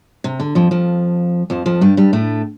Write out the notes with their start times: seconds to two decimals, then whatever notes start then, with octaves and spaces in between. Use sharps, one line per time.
0.24 C3
0.40 D3
0.55 F2 F3
0.71 F2 F3
1.50 F2 F3
1.66 F2 F3
1.81 G2 G3
1.97 G2 G3
2.13 A2 A3